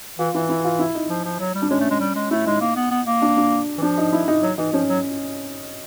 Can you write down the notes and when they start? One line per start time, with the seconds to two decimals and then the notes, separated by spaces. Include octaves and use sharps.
0.19 E3 F4
0.35 E3 E4
0.49 E4
0.65 F4
0.79 E4
0.95 D#4
1.10 F3
1.25 F3
1.40 F#3
1.55 G3
1.62 D4
1.70 G#3 C#4
1.80 A3
1.91 G#3
2.01 G3
2.16 G#3
2.31 A3 E4
2.46 G#3 D#4
2.61 A#3
2.76 B3
2.91 B3
3.07 A#3
3.22 D4
3.37 D4
3.78 E3
3.82 F3 D4
3.98 D#4
4.13 E4
4.28 D#4
4.42 F#3
4.58 E3 D#4
4.73 F3 C#4
4.88 F#3